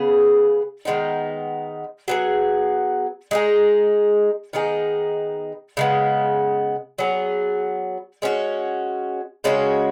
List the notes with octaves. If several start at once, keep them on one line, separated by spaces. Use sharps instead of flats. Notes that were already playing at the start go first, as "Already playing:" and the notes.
Already playing: C#3 B3 G#4
D#3 G#3 B3 D#4
F#3 B3 G#4
G#3 D#4 G#4
D#3 B3 D#4 G#4
C#3 G#3 B3
F#3 B3 G#4
G#3 C#4 F#4
C#3 G#3 C#4 F#4